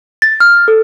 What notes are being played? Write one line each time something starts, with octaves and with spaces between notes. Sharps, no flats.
A6
F6
A4